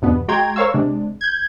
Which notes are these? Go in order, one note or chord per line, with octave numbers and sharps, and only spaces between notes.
E2 G2 B2 B3
G#3 F#4 G5 A#5 C6 G#6
A#4 C5 C#5 F5 C#6 E6
C3 G#3 D4
G6 G#6